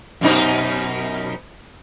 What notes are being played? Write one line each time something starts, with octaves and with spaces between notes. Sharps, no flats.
F#2 B2 D#4